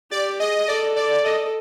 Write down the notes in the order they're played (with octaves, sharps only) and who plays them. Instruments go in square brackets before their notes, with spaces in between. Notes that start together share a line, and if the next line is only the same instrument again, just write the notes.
[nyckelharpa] G4 [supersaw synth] D5
[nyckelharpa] G#4 [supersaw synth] D#5
[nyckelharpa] A4 [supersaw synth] D5
[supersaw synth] D5
[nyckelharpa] A4 [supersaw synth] D#5